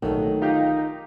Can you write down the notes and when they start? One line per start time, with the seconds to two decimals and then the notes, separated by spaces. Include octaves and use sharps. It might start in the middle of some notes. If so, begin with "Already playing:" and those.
0.02 A#1 B2 D#3 F#3 A3
0.42 D#4 F4 G4 F5